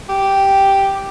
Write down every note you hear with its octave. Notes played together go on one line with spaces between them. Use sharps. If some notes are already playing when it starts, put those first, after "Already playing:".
G4